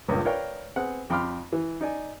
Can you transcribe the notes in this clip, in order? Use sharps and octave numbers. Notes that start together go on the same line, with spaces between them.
C#2 G2 A#2
A#4 B4 C#5 D5 F5 G5
B3 C4 G#4 F#5
F2 G5 B5 C6 D6 F6
E3
D#4 D5 G#5